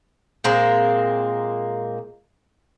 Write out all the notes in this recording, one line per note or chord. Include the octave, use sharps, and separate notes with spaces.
A#2 G#3 A#3 C4